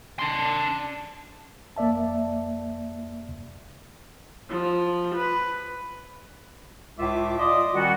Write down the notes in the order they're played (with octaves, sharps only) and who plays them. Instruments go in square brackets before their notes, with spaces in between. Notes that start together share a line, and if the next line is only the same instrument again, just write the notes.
[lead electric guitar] D4 C6
[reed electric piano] F2 A#3 D5 E5 A5
[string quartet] F3
B4
[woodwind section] C#2 A2 F4 E5 D6
F4 D5 D#5 C6 D6 D#6
D#3 G3 C#4 F4 F#4